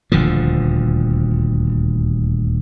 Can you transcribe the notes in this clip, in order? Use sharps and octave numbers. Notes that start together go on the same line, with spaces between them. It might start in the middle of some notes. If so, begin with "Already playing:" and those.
D#1 D2 D3 F3